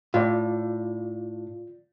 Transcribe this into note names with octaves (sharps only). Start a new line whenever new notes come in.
A2 F4 D5